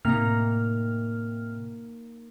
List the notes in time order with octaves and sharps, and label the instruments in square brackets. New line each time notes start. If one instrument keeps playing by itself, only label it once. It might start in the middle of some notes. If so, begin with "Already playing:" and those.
[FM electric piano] A2 C3 F6 [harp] A#3 D#4